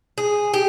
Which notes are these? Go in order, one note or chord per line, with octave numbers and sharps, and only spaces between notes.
G#4
G4